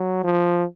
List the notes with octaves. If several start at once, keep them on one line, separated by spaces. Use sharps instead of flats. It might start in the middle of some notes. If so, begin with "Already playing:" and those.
Already playing: F#3
F3